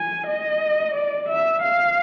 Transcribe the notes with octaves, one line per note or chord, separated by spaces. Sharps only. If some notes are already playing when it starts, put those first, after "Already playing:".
Already playing: G#5
D#5
D5
E5
F5